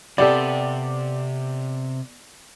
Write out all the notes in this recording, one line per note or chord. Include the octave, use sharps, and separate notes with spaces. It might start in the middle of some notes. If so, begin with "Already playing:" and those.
C3 B3 G4 A4 D5